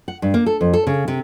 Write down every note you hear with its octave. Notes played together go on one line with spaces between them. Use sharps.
F#5
G2
A#3
A4
F2
A4
C#3
C3